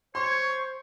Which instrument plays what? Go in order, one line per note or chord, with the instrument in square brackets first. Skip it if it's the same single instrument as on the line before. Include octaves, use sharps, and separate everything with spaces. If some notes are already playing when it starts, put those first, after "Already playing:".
[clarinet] C5 [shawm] C#5 [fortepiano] C6 [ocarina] C#6